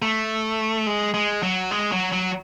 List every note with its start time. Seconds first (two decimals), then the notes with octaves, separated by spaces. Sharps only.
0.02 A3
0.87 G#3
1.14 G#3
1.43 F#3
1.71 G#3
1.92 F#3
2.12 F#3